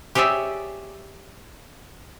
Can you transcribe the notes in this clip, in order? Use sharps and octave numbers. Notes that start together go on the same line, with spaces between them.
G4 G#4 C#5 D5 E5 G#5